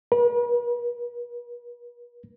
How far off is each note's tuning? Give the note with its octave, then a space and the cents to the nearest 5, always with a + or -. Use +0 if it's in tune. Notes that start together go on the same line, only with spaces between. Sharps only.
B4 -45